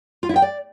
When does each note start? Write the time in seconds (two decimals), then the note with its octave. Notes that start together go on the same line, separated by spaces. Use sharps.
0.23 F4
0.29 E4
0.36 G5
0.42 D5